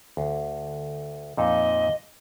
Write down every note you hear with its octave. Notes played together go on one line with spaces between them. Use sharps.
D2
F2 A#2 D#4 D#5